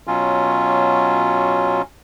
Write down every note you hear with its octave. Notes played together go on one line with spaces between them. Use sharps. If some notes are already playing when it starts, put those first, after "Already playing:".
B2 F#3 C#4 F4